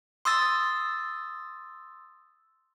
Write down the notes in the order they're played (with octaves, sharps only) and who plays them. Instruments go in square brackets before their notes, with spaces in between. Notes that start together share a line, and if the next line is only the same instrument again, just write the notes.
[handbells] C6 D#6 E6 A6